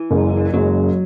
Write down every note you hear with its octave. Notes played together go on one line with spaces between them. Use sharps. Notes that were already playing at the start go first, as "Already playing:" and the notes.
Already playing: E3
F#1 F#2 C#3 G#3
F#1 F#2 C#3 F#3 G#3